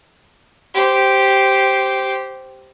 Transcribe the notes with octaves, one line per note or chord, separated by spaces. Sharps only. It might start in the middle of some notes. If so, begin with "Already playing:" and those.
G4 C5